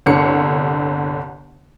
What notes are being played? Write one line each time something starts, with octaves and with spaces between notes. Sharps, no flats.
G1 C2 D3 C#5 C7 C#7